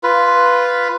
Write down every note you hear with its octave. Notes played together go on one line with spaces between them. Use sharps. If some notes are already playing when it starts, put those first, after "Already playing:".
F4 B4